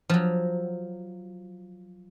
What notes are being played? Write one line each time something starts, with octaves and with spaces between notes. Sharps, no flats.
F3 F#3